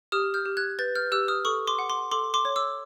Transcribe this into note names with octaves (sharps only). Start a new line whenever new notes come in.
G4 D#6 F6
F6 G6
G4
F#6 G#6
B4 G6 A6
F6 G6
G4 E6 F#6
D#6 F6
A4 C#6 D#6
C6 D6
F#5
C6 D6
A4 C6 D6
C6 D6
C#5
D6 E6